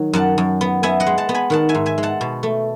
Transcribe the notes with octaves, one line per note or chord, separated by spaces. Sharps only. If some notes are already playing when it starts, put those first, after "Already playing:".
Already playing: D#3 F#3
F#2 F#5 A5
F#2
B3
B3 E5 G#5
D#5 F#5
G#3
F#5 A5
B3
G#5 B5
D#3 F#5 A5
E5 G#5
G#2
E5 G#5
G#3
F#5 A5
B2
A3